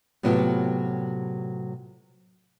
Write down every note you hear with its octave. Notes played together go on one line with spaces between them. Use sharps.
A2 C3 F#3 B3 F4 G4